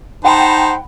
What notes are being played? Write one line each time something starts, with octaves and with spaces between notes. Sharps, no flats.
D#4 C5 F#5 G5 A5 B5